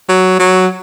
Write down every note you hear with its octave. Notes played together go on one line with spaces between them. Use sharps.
F#3
F#3